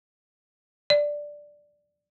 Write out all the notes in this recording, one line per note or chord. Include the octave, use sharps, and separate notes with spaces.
D5